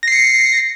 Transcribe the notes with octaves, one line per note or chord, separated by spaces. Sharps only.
A#6 C7 C#7